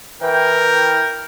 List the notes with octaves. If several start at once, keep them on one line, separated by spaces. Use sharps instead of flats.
E3 A#4 G5